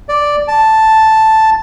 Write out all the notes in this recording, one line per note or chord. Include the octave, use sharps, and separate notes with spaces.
D5
A5